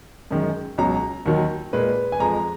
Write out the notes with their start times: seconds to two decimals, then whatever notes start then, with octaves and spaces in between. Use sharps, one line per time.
0.31 F#2 D#3 G#3
0.78 C#2 B2 F#3 A#5
1.26 D#2 D#3 F#3
1.73 A#2 G#3 B4
2.12 G#5
2.20 F2 F3 G#3 A#5